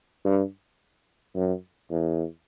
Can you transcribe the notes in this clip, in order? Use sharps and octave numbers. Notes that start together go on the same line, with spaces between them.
G2
F#2
E2